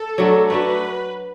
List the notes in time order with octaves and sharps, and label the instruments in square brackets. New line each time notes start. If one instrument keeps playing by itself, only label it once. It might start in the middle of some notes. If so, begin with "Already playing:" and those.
Already playing: [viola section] A4
[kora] F#3 A3 D4 F#4
[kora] A3 D4 F#4 [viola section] B4